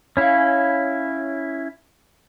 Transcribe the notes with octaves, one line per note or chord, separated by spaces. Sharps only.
C#4 E4 C#5 F5